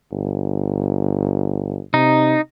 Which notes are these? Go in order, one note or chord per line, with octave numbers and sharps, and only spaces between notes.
G1
C3 D#4